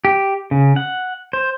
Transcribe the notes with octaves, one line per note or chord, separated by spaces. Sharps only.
G4
C#3
F#5
C5